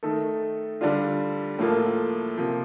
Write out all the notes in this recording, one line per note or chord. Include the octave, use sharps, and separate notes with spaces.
D#3 A3 D#4 A4
D3 G3 D4 F4
A2 F3 A#3 F4 A4
C3 F3 A#3